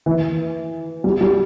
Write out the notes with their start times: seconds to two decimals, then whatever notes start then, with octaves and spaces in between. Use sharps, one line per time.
0.06 E3
1.04 G3
1.21 G3